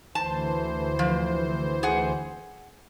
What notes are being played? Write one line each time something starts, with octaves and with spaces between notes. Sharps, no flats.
D2 E3 C5 A5
F3
G#4 F#5